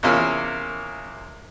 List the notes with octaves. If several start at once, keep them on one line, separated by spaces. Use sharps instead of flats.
E2 C3 A#3 C#4 F4 E6